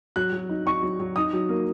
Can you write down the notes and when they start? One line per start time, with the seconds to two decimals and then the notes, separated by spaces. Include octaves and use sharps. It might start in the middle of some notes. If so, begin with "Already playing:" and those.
0.16 F#3 F#6
0.32 F#3
0.49 D#4
0.66 D#4 C#6
0.82 F#3
1.00 F#3
1.16 D#4 D#6
1.33 F#3
1.49 A#3